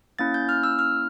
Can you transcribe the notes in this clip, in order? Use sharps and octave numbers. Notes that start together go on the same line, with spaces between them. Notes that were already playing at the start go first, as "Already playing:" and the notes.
A#3 C#4 E4 A6
G6
F6
E6
F6